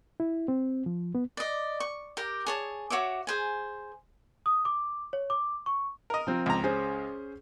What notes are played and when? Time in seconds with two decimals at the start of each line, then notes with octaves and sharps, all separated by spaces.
0.20 E4
0.48 C4
0.86 F3
1.15 B3
1.37 D5 D#5
1.80 C#6
2.17 G4 A#4
2.46 G#4 C#5 A5
2.90 F#4 C#5 E5 D6
3.27 G#4 C5 G#5
4.46 D#6
4.65 D6
5.13 C#5
5.30 D6
5.66 C#6
6.10 A#4 D#5
6.27 F3 C4
6.46 C#2 A#5
6.63 C#4 G#4 C5